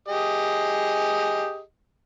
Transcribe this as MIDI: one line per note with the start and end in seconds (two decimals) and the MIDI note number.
0.08 1.61 67
0.08 1.61 68
0.08 1.61 75